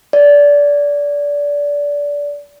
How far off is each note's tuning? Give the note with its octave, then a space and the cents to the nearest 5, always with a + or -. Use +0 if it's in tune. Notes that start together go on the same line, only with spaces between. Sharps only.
D5 -20